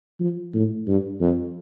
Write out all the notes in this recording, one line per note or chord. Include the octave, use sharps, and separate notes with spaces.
F3
A2
G2
F2